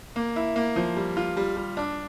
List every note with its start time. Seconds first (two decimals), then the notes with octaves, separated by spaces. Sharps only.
0.16 A#3
0.36 E4
0.56 A#3
0.76 F3
0.96 G3
1.17 F4
1.37 G3
1.57 G3
1.77 D4